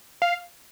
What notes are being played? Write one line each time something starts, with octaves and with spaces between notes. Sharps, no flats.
F5